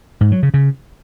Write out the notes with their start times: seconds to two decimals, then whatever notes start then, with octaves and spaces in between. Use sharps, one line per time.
0.21 G#2
0.32 F#3
0.43 C#3
0.54 C#3